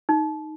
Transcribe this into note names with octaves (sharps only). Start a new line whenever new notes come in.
D#4